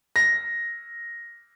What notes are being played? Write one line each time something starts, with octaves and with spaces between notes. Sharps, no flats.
A#6